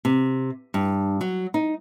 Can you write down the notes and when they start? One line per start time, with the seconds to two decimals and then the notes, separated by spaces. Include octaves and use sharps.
0.05 C3
0.74 G2
1.21 F#3
1.54 D#4